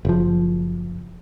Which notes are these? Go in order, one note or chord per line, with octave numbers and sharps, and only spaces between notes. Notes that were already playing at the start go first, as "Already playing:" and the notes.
F#1 F3